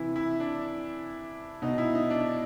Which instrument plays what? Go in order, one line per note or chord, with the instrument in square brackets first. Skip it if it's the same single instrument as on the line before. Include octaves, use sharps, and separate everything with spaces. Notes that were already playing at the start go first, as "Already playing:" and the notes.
Already playing: [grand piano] C3 E3 E4
E4
D4
B2 D#4
E4
D#4
D4